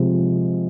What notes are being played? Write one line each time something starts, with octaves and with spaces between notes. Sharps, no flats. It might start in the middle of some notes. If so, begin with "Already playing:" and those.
Already playing: C3 F3 G#3